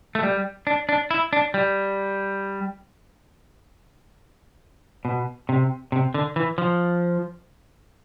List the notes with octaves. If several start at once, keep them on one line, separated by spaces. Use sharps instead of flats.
A3
G3
D4
D4
E4
D4
G3
B2
C3
C3
D3
E3
F3